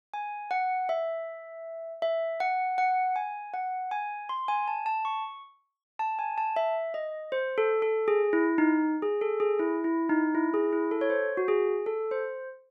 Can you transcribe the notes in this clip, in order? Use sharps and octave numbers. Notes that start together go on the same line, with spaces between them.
G#5
F#5
E5
E5
F#5
F#5
G#5
F#5
G#5
C6
G#5
A5
A5
C#6
A5
G#5
A5
E5
D#5
C5
A4
A4
G#4
E4
D#4
G#4
A4
G#4
E4
E4
D#4
E4
G#4
E4
A4
C#5
C5
F#4
G#4
A4
C5